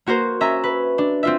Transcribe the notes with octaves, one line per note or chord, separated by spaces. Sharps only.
A#3 F#4 A#4 C5
C#4 E5 A#5
B4
D4
C4 F4 E5